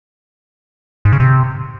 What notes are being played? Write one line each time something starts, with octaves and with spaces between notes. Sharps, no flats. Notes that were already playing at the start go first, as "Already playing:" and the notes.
G#2
C#3
C3